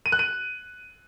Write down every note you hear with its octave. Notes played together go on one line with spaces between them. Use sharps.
D#7
F#6
D#7